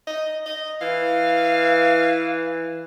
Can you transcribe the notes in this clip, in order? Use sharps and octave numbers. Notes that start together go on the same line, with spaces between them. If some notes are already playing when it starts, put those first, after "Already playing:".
D#5
D#5
E3 F5